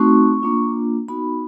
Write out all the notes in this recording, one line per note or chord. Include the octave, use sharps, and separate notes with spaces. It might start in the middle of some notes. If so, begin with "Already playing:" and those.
Already playing: A3 C4 D#4 F#4 C#6
A#3 D4 F4
B3 D#4 F#4 B5